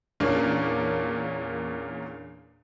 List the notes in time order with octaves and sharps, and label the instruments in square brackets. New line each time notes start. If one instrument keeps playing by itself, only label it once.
[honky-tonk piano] E2 A#2 A#3 C#4 D4